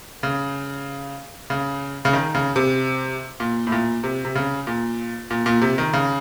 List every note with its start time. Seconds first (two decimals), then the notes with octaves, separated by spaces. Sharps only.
0.23 C#3
1.50 C#3
2.05 C#3
2.13 D#3
2.35 C#3
2.56 C3
3.40 A#2
3.67 A2
3.72 A#2
4.03 C3
4.25 C3
4.35 C#3
4.67 A#2
5.30 A#2
5.46 A#2
5.61 C3
5.78 D#3
5.93 C#3